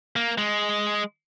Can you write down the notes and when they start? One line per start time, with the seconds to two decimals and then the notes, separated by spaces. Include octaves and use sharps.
0.16 A#3
0.38 G#3